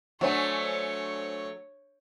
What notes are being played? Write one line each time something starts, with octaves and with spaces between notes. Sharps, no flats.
F#3 A3 D4 C5 C#5 G#5